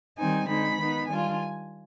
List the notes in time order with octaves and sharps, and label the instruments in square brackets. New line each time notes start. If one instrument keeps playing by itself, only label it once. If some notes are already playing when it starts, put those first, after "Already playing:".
[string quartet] D#3 G3 C4 D#4 G#5
D3 G#3 C4 D#4 B5
D#3 B3 D#4
D#3 G3 D4 F4 G#5